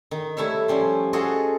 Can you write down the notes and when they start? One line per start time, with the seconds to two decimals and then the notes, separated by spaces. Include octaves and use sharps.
0.11 D#3
0.37 G3 A3 E4 C#5 E5
0.68 F3 G3 C#4 C5
1.13 F4 F#4 G#4 A4 D#5